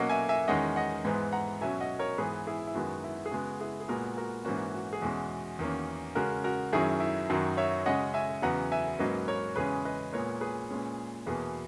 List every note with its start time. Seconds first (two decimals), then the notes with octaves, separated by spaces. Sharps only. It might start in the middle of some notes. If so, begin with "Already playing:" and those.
Already playing: B2 F#3 A#3 C#4 D#5 F#5
0.10 E5 G#5
0.29 E5 G#5
0.48 E2 D#3 G#3 C#4 D#5 F#5
0.76 D#5 F#5
1.05 G#2 E3 G#3 B3
1.33 F#5 A#5
1.61 B2 F#3 C#4 E5 G#5
1.80 D#5 F#5
1.99 A#4 C#5
2.18 G#2 E3 B3 G#4 B4
2.47 E4 G#4
2.67 E4
2.75 F#2 D#3 G#3 B3 F#4
3.04 E4
3.26 G#4
3.31 C#3 G#3 B3 F#4
3.61 E4 G#4
3.80 G#4
3.88 A#2 G#3 B3 F#4 A#4
4.17 F#4 A#4
4.45 G#2 E3 A#3 C#4 F#4
4.74 F#4
4.93 G#4
5.02 E2 B2 G#3 C#4 F#4
5.59 E2 D#3 A#3 C#4
6.15 C#3 G#3 C#4 F#4 A#4
6.44 F#4 A#4
6.72 F#2 D#3 F#3 C#4 E4 G#4
7.00 E4
7.30 F#2 D#3 F#3 F#4
7.57 C#5 E5
7.86 C#3 G#3 C#4 D#5 F#5
8.14 E5 G#5
8.42 E2 C#3 F#3 B3 F#5 A#5
8.72 E5 G#5
8.99 G#2 F#3 A#3 C#4 B4 D#5
9.28 A#4 C#5
9.56 E2 C#3 G#3 C#4 G#4 B4
9.85 B4 D#5
10.12 A#2 G#3 B3 A#4 C#5
10.41 G#4 B4
10.70 A#2 G#3 C#4
11.26 E2 B2 A#3 G#4 B4